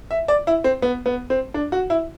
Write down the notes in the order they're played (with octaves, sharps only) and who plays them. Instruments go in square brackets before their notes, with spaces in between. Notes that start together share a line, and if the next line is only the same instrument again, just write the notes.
[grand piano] E5
D5
E4
C4
B3
B3
C4
D4
F#4
E4